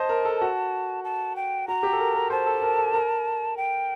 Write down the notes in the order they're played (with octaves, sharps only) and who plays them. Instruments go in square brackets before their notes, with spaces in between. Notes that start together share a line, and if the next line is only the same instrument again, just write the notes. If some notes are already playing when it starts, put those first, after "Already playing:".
Already playing: [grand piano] C5 D#5 [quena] A5
[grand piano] A#4
A4
F#4
[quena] A5
G5
[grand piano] F#4 [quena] A#5
[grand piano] G4
A4
A#4
A#4
[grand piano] C5 [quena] A5
[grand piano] A4
A#4
A4
A#4
[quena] G5